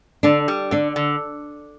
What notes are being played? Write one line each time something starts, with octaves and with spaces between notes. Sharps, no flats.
D3 D4
G3
D3 D4
D3